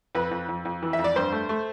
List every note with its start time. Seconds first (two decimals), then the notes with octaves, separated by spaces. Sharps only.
0.15 F2 B4
0.31 F2
0.49 F2
0.65 F2
0.83 E3
0.93 E5
0.99 F2
1.04 D5
1.16 G2 C5
1.32 A3
1.49 A3